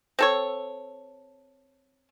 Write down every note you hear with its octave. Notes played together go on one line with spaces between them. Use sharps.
C4 A4 C#5